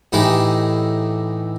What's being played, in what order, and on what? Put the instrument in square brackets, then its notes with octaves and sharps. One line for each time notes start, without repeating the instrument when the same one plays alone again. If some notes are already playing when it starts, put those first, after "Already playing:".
[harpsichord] A2 E3 D#4 E4 G4 G#4